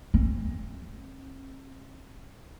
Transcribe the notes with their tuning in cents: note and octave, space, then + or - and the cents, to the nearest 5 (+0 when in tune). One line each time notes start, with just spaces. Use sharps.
C4 +45